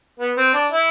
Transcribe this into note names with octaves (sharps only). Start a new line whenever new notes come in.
B3
C4
D4
E4